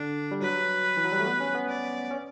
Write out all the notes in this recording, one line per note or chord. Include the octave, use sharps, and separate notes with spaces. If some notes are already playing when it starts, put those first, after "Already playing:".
Already playing: D3 D4
G3
F#3 B4
E3
F#3
G3
A3
B3
C#4
B3
D5
C#4